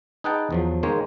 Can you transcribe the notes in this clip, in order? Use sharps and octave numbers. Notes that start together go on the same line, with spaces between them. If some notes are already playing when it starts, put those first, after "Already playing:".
D#4 G#4 B4 F#5 G5 A5
E2 F3 F#3
D#3 G#3 A#3 C5 C#5